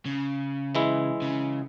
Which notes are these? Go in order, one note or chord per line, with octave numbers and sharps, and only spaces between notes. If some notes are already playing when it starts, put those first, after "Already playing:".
C#3
E3 G#3 E4
C#3